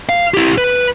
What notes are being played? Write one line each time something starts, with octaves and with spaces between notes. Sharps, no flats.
F5
E4 G4
B4